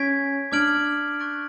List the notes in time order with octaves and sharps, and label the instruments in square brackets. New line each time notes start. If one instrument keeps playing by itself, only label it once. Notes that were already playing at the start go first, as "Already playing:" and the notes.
Already playing: [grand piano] C#4 [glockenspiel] C#6 G#6 B6 D7
[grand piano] D4 [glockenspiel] D6 F6 G#6 D7 F#7
[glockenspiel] C#6 F#6 A6 D7